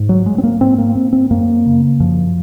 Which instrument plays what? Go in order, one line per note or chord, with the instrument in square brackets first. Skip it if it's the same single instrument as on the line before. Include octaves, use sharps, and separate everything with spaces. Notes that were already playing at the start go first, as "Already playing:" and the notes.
Already playing: [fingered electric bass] G#2
F#3
G#3
C4
A#3
G#2 C4
A#3
C4
C4
F#2 A#3
C#3
F#2 F3